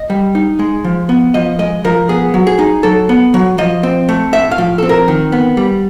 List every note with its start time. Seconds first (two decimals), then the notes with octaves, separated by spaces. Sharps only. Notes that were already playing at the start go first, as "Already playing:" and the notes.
Already playing: D#5
0.10 G3
0.35 D#4
0.59 G#3
0.84 F3
1.09 B3
1.34 F3 D#5
1.59 G#3 D#5
1.84 F3 A#4
2.09 B3 G#4
2.34 F#3
2.47 G#4
2.59 D#4
2.83 F#3 A4
3.09 B3
3.34 F#3
3.58 F3 D#5
3.83 C4
4.09 A3
4.33 A2 E5
4.51 F5
4.58 F3
4.78 C4 A4
4.89 A#4
5.08 D#3
5.32 B3
5.57 G3